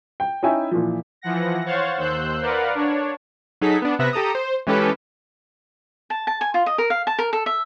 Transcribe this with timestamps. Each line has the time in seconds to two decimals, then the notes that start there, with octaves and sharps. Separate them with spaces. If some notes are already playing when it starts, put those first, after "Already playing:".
0.20 G5
0.43 C#4 D#4 E4 E5 G5 G#5
0.71 A#2 E3 F3
1.22 E3 F3 F#5 A#6
1.66 C5 C#5 F5 F#5 C#6 A6
1.97 D#2 C5 E6 F#6 G6
2.41 A#4 B4 D5 F5 F#5
2.75 D4 C#5
3.61 F#3 D#4 G#4 A4 B6
3.82 B3 D4
3.99 C3 B3 E5 F#6 A#6
4.13 G4 A4 A#5 D#6
4.35 C5
4.67 E3 G#3 C#4 G4 A4 B4
6.10 A5
6.27 A5
6.41 G#5
6.54 F4
6.66 D#5
6.78 A#4
6.90 F5
7.07 A5
7.19 A#4
7.33 A4
7.46 E5